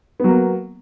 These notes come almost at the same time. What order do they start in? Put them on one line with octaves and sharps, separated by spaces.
B3 F#3 A#3